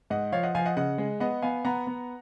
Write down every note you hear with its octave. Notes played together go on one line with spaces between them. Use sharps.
G#2 D#5 F#5
F3 C#5 F5
D#5 F#5
F3 F5 G#5
D#5 F#5
C#3 D#5 F#5
G#3
B3 D#5 F#5
B3 F5 G#5
B3 F#5 A#5
B3